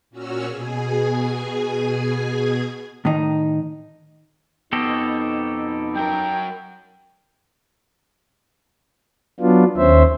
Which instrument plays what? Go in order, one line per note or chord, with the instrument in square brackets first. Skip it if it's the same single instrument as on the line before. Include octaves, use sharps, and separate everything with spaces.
[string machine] A#2 C#4 F#4 E6 F6
B2 G#4 G#5
[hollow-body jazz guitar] A2 D#3 D#4
[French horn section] F2 D#4 [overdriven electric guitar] B2 [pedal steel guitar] G4 A4 D#5
[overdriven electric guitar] F#3 A#4 [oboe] G5
[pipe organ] F#3 B3 D4 F4
D#2 C#4 C5 E5